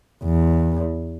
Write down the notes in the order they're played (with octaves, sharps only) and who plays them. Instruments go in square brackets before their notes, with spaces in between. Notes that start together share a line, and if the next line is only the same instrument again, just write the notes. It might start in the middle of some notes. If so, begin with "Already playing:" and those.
[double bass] E2